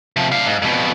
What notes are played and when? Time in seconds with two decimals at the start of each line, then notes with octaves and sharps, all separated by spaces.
0.16 C3 F3
0.32 D4 F5
0.46 G#2
0.62 F2 B2